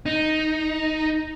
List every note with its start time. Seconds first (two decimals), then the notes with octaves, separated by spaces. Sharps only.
0.06 D#4